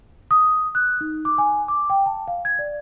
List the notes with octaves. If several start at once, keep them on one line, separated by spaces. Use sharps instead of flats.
D#6
F#6
D#4
D6
G#5
D6
G5
A5
F5
G#6
D5